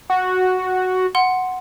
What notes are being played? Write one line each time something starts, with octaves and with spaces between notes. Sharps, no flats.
F#4
F#5 C6